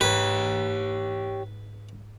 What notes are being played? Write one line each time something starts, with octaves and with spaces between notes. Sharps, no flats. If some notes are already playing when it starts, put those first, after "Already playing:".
G#2 G4 B4 C#5 G6 G#6